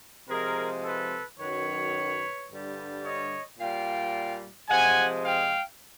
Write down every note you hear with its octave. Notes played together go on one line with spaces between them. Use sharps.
C3 F3 G#3 G#4 A#4
A4 B4
F#2 D#3 F#3 B4 C#5
G2 D3 G3
C#5 D#5
A#2 G3 F5 G5
C3 F3 G#3 F#5 G#5
F5 G5